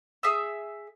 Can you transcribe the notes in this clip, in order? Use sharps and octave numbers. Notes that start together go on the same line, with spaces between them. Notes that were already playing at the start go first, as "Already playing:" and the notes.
G#4 E5 D#6 E6